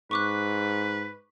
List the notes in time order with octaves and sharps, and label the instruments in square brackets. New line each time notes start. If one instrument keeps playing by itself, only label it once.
[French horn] G#2 [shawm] B4 [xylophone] C#6 D6 F#6